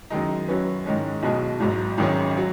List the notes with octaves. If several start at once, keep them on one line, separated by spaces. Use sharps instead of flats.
F#2 D#3 G#3 D#4
F#2 F#3 C#4 B4
G#2 D#3 G#3 C#4
B1 B2 G#3
G#1 G#2 F#3
G#1 F#2 D#3 G#3 C#4
F#3